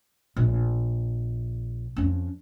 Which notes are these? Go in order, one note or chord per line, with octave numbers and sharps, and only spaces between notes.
A#1
F2 C#4